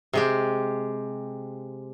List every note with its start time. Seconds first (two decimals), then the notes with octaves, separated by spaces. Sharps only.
0.13 C3 G#3 G4